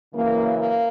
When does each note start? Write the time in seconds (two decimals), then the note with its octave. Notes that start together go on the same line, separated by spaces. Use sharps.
0.15 F#2 C#3 E3 A#3
0.56 A#3